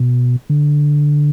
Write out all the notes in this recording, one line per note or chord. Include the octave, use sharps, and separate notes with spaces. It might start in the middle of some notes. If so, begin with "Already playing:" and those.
Already playing: B2
D3